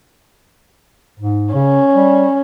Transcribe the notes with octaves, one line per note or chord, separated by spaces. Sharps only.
G#2
C#3 C#4
G3